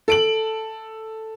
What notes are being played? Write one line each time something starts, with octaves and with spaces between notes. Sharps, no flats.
A4 D7 F#7